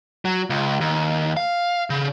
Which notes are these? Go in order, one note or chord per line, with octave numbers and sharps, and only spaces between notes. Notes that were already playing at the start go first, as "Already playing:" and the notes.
F#3
C#2
D#2
F5
C#3